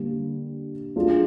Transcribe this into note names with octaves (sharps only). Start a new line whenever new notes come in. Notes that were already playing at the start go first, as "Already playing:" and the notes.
Already playing: D3 G3 A#3
F#3 A3 D4 F4 G#4